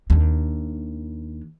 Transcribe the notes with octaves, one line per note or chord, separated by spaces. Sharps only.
D#2 D4